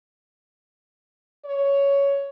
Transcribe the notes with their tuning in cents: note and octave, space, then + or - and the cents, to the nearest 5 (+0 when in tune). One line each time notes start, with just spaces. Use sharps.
C#5 +10